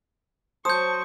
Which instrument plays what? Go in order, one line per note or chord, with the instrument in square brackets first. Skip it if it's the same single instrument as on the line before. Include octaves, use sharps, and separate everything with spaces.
[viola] F#3 C#6 [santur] C5 [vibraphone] A5 [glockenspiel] D#6 G6